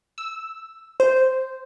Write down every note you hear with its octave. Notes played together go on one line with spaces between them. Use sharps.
E6
C5